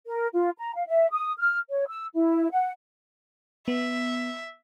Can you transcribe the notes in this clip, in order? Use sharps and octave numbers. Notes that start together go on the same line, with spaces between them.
A#4
F4
A#5
F5
E5
D#6
F6
C#5
E6
E4
F#5
B3 E5